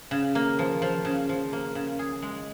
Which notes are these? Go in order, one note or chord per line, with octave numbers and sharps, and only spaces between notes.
C#3
A#3
F3
F3
C#3
F3
A#3
C#3
G#4
G#3